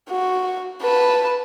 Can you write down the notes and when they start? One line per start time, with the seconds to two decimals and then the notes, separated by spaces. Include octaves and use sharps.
0.10 F#4
0.82 B4 A5